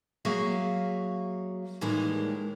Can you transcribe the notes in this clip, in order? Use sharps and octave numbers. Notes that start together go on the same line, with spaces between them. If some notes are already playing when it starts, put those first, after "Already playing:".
F#3 A#3 F#4 G#4 E5 F5
A2 D#3 E3 G3 G#3 A#3